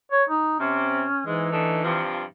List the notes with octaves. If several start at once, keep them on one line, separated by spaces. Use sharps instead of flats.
C#5
D#4
C3 C#4
G#2 E3 G#3
D3 A3 D#4
G2 C3 F3